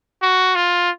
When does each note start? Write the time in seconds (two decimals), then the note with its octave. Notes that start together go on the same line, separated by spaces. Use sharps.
0.22 F#4
0.55 F4